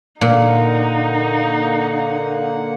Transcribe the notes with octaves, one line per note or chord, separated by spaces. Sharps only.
A#2 D3 A#3 D#4 F#5